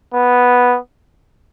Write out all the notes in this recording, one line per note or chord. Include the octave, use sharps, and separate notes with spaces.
B3